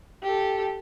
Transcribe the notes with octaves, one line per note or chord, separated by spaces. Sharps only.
G4 A4